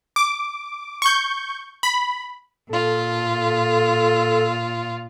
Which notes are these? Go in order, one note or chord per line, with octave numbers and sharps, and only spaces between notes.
D6
C#6 G6
B5
A#2 F4 A4